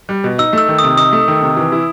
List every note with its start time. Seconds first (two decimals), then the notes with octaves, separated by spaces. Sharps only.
0.09 G3
0.24 B2
0.38 D#4 E6
0.53 A3 E6
0.68 D#3
0.79 C3 D#6
0.97 D#4 D#6
1.12 A3
1.28 D#3
1.42 C3
1.57 E3
1.72 E4